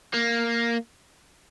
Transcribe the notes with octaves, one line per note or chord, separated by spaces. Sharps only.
A#3